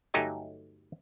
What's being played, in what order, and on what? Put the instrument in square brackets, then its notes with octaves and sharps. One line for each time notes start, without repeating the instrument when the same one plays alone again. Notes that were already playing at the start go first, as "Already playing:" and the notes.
[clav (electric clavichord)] G1 F#3 A3 D#4 G4 G#5